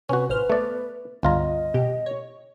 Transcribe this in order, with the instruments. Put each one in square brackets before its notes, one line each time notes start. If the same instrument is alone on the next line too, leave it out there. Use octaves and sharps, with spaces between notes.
[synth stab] C3 [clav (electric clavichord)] C#4 F#4 [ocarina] B4
[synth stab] A1 C5 F6 [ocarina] B4
[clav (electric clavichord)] A3 D5 [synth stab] B3
[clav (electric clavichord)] G1 F4 A#5 [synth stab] C#2 [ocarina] D#5
[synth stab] B2 G4
C#5